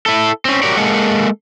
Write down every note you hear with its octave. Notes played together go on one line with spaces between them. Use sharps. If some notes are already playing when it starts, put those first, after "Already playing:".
E4 A4
C4 C#4
F#4 G4 A#4 C#5 D5
G#3 A#3 G#4 A4 F#5